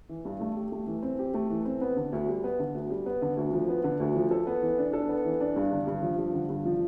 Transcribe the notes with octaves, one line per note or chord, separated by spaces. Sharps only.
E3
G2
A3
G4
A3
E3
C4
G4
A3
E3
C4
B3
D3
D2
G3
B3
D3
D2
G3
B3
D3
D2
F3
B3
D3
D2
F3
A4
B3
E3
D4
A4
B3
E3
D4
G2
D3
G2
F3
G2
D3
G2
F3